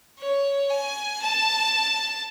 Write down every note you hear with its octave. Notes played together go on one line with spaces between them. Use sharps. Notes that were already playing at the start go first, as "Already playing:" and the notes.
C#5
G#5
A5